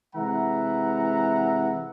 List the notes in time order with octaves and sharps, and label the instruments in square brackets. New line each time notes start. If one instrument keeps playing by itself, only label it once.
[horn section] C3 E3 G#3 E5 F#5 A#5